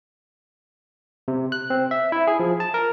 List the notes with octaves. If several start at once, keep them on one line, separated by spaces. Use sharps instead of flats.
C3
F#6
C4
E5
E4
G#4
F3
A5
A#4